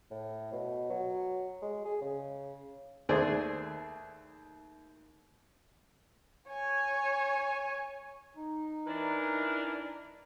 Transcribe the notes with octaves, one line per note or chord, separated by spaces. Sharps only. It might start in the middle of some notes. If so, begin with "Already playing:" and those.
A2
B2
F#3
G#3
G#4
C#3
D#2 A3 G#4 C5 D5
C#5 G#5
D#4
E3 D4 A#4